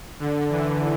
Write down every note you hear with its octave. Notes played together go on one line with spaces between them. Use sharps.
D3
E3